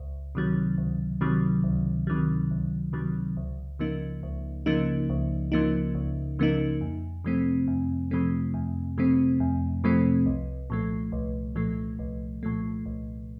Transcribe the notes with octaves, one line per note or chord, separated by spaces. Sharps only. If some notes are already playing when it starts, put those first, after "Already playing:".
Already playing: C#2
C3 D#3 F#3
C#2
C3 D#3 F#3
C#2
C3 D#3 F#3
C#2
C3 D#3 F#3
C#2
C#3 F3 A#3 D#4
C#2
C#3 F3 A#3 D#4
C#2
C#3 F3 A#3 D#4
C#2
C#3 F3 A#3 D#4
F2
C3 F3 A3 C4
F2
C3 F3 A3 C4
F2
C3 F3 A3 C4
F2
C3 F3 A3 C4
C2
A#2 F3 A3
C2
A#2 F3 A3
C2
A#2 F3 A3
C2